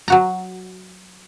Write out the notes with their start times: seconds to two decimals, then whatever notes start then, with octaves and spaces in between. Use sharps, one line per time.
0.08 F#3 F#4 A#5